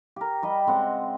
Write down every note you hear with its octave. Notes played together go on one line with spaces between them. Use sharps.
G4 A#4
G3 G4 D#5 B5
C#3 G#3 C4 F#5